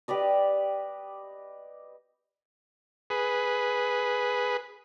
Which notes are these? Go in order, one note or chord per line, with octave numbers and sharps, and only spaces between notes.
G4 B4 D5 D#5
G#4 B4